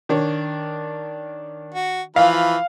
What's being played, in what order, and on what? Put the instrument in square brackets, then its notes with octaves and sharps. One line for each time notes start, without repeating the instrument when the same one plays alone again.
[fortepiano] D#3 D4 C#5
[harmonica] F#4
[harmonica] E3 F3 B5 [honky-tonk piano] F5